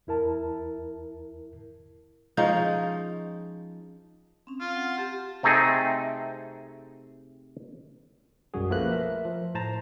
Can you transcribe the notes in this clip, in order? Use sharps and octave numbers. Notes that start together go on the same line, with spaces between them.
E2 E4 A#4 A5
F3 G#3 C#4 D#4
C4 C#4
C4 F4 F5
F#5
G4 A5
C3 A3 C4 D#4 G#4
B1 F#2 G3 F#4 G#4
F3 A3 A#3 B4 F#6
A#4 E5
F3
A2 C5 A5 A#5